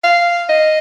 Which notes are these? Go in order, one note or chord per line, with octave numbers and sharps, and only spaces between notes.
F5
D#5